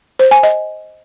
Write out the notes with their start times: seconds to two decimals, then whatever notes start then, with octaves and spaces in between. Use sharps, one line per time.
0.19 C5
0.31 G#5
0.43 D#5